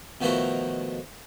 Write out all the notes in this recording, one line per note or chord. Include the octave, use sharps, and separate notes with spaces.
B2 D#3 F3 A3 E4 F#4